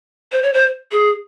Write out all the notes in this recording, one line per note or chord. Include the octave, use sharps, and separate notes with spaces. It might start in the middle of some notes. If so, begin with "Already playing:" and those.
C5
C#5
C5
G#4